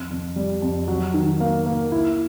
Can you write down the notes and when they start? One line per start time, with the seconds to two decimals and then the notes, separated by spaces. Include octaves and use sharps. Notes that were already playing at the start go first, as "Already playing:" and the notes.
Already playing: F2
0.10 F2
0.36 G3
0.62 F2
0.88 F#3
1.14 D#3
1.40 A#3
1.66 A#3
1.92 E4